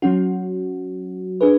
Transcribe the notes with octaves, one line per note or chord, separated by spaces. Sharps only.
F#3 C#4 F#4
D4 G#4 B4